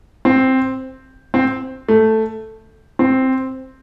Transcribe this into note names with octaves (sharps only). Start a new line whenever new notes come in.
C4
C4
A3
C4